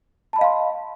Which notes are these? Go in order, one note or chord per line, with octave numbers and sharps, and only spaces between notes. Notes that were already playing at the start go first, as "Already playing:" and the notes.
D#5 F5 A5 B5 C6